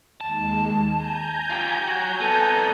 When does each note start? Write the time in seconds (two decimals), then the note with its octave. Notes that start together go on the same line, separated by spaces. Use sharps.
0.21 D#2 G#3 A5
0.88 G#5 A#5 G6
1.50 F4 G4
1.88 F#3 F#4
2.21 C2 B3 A4